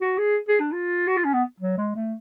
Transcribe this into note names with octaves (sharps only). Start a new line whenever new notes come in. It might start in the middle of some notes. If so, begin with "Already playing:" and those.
F#4
G#4
G#4
D4
F4
F#4
F4
C#4
B3
F#3
G#3
A3